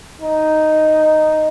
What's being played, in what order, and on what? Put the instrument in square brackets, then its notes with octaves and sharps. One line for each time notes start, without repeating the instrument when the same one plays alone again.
[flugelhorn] D#4